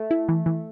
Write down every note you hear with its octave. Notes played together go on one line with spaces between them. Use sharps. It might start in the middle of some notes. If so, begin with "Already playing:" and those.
Already playing: A3
E4
E3
E3